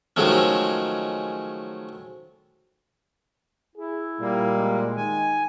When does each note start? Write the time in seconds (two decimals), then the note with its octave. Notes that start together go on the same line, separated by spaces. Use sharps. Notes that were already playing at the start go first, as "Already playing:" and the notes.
0.16 D#3 F3 F#3 G#3 A3 C#4
3.76 E4 G#4
4.20 A#2 G3 A#3
4.54 G#3
4.97 D#3 G#5